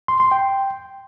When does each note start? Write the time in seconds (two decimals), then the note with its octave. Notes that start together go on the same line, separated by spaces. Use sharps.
0.08 C6
0.20 C6
0.31 G5